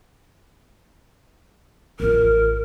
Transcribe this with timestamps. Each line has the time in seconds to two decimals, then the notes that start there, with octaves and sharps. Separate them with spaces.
2.00 A1 F4 A#4